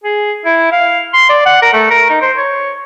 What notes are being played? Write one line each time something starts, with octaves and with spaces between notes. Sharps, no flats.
G#4
E4
F5
C6
D5
F#5
A#4
A3
A#4
D#4
C5
C#5